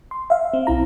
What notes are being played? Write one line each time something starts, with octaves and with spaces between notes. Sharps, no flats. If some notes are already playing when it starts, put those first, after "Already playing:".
C6
E5 F5
C4
B1 C4 E4 A#5